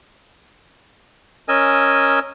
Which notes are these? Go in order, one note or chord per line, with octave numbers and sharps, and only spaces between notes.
C#4 A#4 D#5 G#5 E6